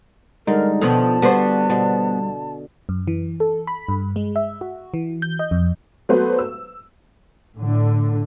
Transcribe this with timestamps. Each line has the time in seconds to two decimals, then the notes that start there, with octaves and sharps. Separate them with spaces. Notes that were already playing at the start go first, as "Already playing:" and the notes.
0.47 D3 G3 G#3 D#4 A#4
0.81 B2 D#3 F3 B3 A4 A5
1.22 D3 G3 B3 F#4 C5
1.70 B2 D3
2.89 F#2
3.07 E3
3.40 A4
3.67 B5
3.89 G2
4.16 G#3
4.36 E5
4.61 F#4
4.94 E3
5.22 G6
5.39 D#5
5.51 F2
6.09 F#3 A3 B3 B4 C5
6.39 E6
7.57 A2 D3